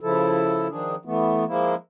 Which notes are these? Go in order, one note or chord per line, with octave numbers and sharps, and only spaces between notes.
C#3 F3 E4 A4
D#3 F3 D4 G#4
E3 A3 B3
F3 G#3 A#3 E4